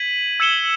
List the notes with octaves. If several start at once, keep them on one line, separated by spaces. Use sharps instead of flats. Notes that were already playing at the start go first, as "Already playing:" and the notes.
Already playing: G#6 B6 D#7 F#7
E6 G#6 C#7 E7 G7